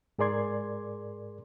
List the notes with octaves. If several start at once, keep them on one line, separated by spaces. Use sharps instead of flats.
G#2 G#4 A#4 D5 C6 G#6